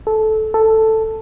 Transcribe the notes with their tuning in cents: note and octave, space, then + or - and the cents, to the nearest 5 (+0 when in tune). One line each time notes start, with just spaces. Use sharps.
A4 -15
A4 +5